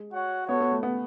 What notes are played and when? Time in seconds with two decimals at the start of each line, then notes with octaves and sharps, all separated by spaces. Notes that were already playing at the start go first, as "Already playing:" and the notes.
Already playing: G#3
0.13 F#4 C#5 F#5
0.48 B3 F#4 A4 C#5
0.60 B3
0.71 A3
0.83 B3